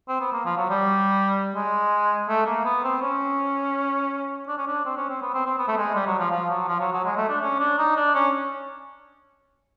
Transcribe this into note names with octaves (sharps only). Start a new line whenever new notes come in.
C4
B3
A#3
F3
F#3
G3
G#3
A3
A#3
B3
C4
C#4
D4
C#4
D4
C4
C#4
C4
B3
C4
C4
B3
A3
G#3
G3
F#3
F3
F3
F#3
F3
F#3
F#3
G#3
A3
D4
C#4
D4
D#4
D4
C#4